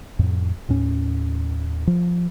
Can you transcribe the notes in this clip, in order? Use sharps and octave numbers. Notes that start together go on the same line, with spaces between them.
F2 A2
D#2 A2 C#4
F3